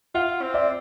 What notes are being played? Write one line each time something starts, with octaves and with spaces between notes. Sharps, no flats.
F4 E5 F#5
C4
D5 E5